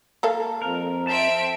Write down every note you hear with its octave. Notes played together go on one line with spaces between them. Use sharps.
A#3 A4 F5
F2 A#4
C4 E5 A5 D7